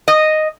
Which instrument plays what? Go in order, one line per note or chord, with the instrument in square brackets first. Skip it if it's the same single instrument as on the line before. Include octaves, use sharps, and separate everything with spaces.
[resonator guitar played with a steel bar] D#5